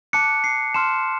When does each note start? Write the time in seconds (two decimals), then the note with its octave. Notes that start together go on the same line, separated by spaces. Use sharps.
0.13 A5 D6 F#6 C#7
0.44 C7
0.74 A5 C6 F6 E7